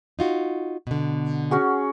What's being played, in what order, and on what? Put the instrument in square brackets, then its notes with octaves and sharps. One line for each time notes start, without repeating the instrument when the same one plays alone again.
[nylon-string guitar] D#4 F4 F#4
B2 D3
[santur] C#4 F#4 G#4